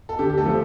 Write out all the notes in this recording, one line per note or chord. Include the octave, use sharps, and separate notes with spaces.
A4
D3 G4
G4
A3 A4
F3